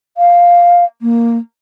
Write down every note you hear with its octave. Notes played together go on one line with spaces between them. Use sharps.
F5
A#3